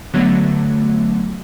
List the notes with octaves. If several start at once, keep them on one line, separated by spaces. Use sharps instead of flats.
D3 F#3 A3 B3